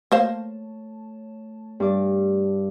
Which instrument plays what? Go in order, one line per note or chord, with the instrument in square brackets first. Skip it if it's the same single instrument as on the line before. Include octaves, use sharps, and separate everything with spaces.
[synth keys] A3 C#5 A5 [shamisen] A#3 C5 F5
[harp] G2 D5